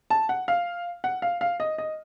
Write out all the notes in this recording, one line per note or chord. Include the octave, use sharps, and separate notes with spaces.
A5
F#5
F5
F#5
F5
F5
D#5
D#5